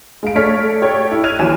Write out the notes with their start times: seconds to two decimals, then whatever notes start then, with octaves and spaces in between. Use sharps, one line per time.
0.23 G#3 F5 D7
0.36 A3 C#5 D5 F6 B6
0.82 G4 A4 C#5 D5 G5
1.11 E4
1.23 F6 F#6 G#6 D#7 F7
1.39 D#2 E3 F#3 E4 E7